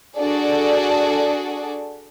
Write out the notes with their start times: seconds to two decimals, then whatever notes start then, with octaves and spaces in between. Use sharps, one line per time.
0.18 D4 F#4 G#4 A4 D5